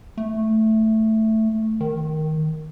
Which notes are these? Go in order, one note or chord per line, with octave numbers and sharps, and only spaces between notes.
A3
D#3